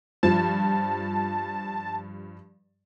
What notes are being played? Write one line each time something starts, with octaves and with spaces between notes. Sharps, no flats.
G2 F3 A5